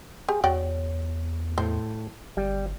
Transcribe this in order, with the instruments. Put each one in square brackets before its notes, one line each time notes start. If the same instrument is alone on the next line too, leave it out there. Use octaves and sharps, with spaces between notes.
[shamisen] G4 [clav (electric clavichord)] G#4
[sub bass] E2 [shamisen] F#4 D5 G5 [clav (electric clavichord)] C#5
[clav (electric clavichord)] A2 [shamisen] C5
[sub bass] G1 [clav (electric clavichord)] G3